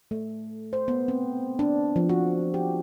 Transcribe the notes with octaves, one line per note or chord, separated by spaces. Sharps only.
A3
C5
B3
C4
D4
F3
F#4
G4